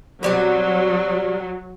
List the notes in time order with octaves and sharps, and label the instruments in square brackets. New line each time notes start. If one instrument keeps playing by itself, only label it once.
[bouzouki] B2 G3 C4 [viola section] F#3